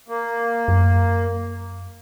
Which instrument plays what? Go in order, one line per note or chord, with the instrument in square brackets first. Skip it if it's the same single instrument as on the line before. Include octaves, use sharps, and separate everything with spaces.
[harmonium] A#3
[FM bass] F#2